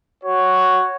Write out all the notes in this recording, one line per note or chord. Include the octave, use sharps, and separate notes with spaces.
F#4 C#5